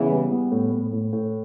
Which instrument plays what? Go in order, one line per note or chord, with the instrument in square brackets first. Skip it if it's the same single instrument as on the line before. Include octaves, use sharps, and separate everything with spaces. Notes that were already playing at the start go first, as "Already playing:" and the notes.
Already playing: [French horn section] C#3 E3 [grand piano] B3
[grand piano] G3
B3
A2
A2
A2
A2